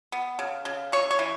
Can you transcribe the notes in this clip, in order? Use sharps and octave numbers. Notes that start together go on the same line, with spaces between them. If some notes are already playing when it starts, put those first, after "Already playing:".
B3
C#3
C#3
E3 C#5
C#5
E3